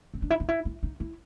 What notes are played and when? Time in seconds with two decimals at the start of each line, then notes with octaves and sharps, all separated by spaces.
0.14 C4
0.22 D4
0.30 E4
0.40 D#4
0.49 E4
0.65 E4
0.83 D#4
1.00 E4